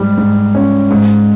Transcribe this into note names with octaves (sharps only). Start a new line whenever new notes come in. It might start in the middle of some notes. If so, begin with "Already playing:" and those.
Already playing: G#2 G3
G#2
C#4
G#2